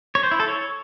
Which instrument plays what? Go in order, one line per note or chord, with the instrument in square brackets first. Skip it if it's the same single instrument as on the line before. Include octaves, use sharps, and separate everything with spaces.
[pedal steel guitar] C#5
C5
E4
A4
C#5